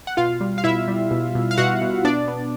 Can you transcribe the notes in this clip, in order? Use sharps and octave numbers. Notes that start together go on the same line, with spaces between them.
F#5
B2 F4 F5
G3
F5
B2 E4 E5
G3
B2
B2
F5
B2 F#4 F#5
B2
B3 D4 D5
B3